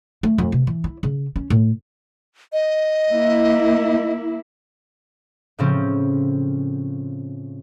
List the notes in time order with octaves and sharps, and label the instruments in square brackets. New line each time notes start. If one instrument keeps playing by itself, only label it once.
[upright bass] A3
F2
C3
E3
E4
C#3
C#4
A2
[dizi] D#5
[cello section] A#3 E4
[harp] A2 C#3 F3 C4 C#4